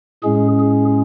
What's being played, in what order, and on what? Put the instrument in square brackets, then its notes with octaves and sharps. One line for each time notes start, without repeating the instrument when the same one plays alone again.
[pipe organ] A2 G#3 C#4 G#4
G#4